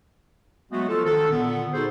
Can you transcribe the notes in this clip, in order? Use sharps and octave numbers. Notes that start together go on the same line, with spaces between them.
F#3 G#3 A3 B3 F#4
F3 F4 F#4 A4
D#3 D4 A4
A#2 D3 B3
B3 D#4 F#4 G#4 A4 C5